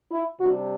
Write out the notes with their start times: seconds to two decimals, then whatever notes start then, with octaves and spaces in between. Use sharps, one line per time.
0.11 E4
0.40 C3 G3 D4 F#4